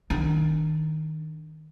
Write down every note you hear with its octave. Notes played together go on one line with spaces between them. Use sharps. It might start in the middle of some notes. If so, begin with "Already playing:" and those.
D#3 D4